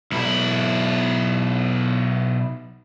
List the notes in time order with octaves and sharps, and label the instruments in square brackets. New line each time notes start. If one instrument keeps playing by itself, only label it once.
[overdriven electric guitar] B1 E4